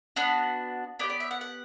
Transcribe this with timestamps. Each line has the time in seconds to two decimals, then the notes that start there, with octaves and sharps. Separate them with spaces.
0.16 B3 D4 F#4
0.99 B3 E4 G4 D5
1.10 D5
1.20 E5
1.31 F#5
1.41 F#5